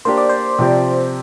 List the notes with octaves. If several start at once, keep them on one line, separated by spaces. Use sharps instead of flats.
A#3 D4 G4 C5
D5
C5
C3 F3 C4 G4 D5